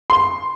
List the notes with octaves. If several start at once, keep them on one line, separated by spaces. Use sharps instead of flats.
C6